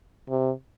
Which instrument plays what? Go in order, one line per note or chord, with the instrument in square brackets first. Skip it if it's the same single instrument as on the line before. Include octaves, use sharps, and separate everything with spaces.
[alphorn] C3